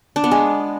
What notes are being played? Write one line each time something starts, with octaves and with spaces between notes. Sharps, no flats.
D4
B3
G#3